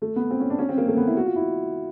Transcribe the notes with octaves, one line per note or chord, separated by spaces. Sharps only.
A3
B3
C4
C#4
D4
C#4
C4
A#3
A3
B3
E4
F#4
F4
E4